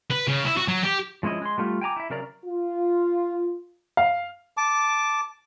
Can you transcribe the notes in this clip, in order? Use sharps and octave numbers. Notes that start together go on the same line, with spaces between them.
B4
C#3
E4
F#4
F#3
G4
F3 G#3 C#4 E4 D#5
G#3 C6
G3 A3 F4
G5 G#5 A#5 D6
E4 E5
C#3 F#3 A#4 D5 A#5
F4
F5
A5 D6